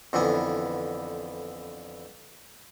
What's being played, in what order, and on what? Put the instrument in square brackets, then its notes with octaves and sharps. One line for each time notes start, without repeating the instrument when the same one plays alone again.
[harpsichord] F2 D3 E3 B3